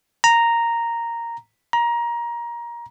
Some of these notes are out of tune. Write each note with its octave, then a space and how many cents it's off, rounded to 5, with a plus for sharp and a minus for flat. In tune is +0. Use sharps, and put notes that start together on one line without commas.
A#5 -5
A#5 +20